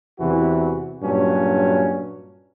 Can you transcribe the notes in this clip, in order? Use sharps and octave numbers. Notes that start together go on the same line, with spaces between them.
E2 C3 E3 F#4
G2 A#2 F#3 C#4